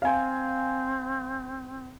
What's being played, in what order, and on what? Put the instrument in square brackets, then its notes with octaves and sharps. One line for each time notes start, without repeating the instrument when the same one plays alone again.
[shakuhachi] C4 [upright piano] F5 G#5